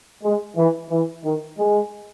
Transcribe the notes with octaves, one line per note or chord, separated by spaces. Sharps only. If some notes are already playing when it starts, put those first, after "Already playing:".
G#3
E3
E3
D#3
G#3